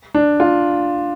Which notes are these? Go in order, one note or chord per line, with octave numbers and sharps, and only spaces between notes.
D4
F4